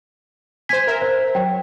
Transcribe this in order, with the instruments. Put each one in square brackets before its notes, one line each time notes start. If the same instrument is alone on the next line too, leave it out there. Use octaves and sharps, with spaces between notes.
[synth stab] C5 G#5 [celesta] G#6 B6
[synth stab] A#4 E5
[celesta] C5
[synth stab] F#3 [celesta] G5